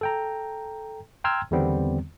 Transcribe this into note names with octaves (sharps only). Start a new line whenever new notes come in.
A4 G5 A#5
G5 A#5 C6 E6 F6 G#6
E2 D3 D#3 G3 B3 C4